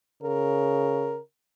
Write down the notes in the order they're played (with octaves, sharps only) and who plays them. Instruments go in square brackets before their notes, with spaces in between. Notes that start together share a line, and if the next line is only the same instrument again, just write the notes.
[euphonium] C#3 [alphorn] A#4